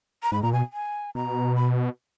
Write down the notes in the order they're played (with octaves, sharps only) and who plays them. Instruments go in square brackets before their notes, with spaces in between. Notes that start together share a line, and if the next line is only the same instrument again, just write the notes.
[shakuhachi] A#5
[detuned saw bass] G#2 [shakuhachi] B5
[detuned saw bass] A#2 [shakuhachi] A#5
[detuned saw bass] B2 [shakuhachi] G#5
[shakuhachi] G#5
[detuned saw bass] B2 [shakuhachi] A#5
[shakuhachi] B5